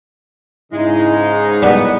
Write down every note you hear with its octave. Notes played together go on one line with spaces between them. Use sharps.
G#2 C#3 G#3 D#4 E4
G#4
F#2 A2 G3 B3